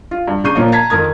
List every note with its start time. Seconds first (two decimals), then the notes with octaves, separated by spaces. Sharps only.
0.11 F4
0.28 G2
0.44 C#3 D4 C#6 G6 C7 D#7
0.55 A#2 F3 A#3 C#5 D#5
0.72 A5 A#5 G#6 B6
0.90 F2 D#3 A#4 D#6 G#6